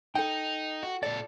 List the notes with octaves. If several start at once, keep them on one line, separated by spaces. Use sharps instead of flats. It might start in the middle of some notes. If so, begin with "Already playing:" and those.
D#4 A4 G5
F#4
A#2 A4 D5